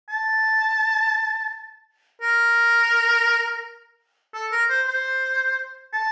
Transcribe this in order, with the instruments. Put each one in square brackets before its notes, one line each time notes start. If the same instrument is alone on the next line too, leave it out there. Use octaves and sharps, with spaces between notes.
[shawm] A5
A#4
A4
A#4
C5
C5
A5